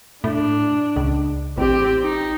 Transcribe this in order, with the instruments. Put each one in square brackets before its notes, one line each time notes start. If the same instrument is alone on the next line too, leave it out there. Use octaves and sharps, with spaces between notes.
[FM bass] A2 [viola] D4
[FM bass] C#2
[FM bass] A1 [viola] C4 G4
[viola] D#4